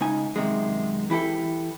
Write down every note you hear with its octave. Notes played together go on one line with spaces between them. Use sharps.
C#2 D#4 G#5
F#2 C3 D#3 G#3
E3 E4 G4 A4